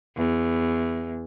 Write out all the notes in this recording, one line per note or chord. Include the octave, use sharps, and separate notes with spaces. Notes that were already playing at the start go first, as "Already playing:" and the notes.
E2